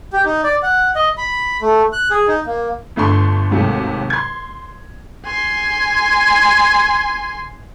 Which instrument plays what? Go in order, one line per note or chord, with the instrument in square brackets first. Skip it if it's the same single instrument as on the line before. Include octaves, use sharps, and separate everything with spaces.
[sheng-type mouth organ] G4
D#4
D5
F#5
D#5
B5
A3
F#6
G#4
D#4
A#3
[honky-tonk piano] G1 A3 D4 C6 C#6
D#2 G#2 C3 F#3 A3
C6 G#6
[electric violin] G#5 C6